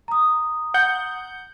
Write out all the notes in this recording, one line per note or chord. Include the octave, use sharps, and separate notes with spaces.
A#5 D#6
F#5 G6